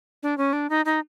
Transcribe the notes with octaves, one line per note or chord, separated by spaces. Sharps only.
D4
C#4
D4
D#4
D#4